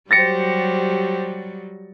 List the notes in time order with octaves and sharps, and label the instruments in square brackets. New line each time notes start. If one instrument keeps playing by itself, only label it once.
[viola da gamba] F#3 G3 [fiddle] G4 C5 [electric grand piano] A6 A#6 C#7